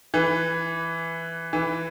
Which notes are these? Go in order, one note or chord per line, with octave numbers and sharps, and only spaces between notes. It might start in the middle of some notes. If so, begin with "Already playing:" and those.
E3
E3